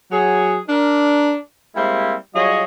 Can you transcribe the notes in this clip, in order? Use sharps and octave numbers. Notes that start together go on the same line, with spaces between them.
F#3 G#4
D4 A#4
G3 G#3 A#3 C4 E4
F#3 G3 F4 G#4 C#5 D#5